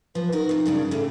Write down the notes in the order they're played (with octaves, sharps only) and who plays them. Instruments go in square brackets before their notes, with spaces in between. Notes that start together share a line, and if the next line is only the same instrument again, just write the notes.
[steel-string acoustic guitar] F3 [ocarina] B4
[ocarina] D#4 [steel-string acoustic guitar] F#4 A#4
[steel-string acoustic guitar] C3 F3
G2 C#3 D4
[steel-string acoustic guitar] A2 C#3 [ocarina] A4